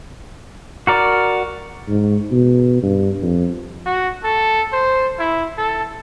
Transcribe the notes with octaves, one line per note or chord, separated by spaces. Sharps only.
F#4 A#4 D5
G#2
B2
G2
F2
F#4
A4
C5
E4
A4